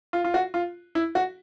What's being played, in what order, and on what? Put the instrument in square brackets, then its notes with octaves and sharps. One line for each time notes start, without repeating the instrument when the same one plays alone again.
[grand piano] F4
F4
F#4
F4
E4
F#4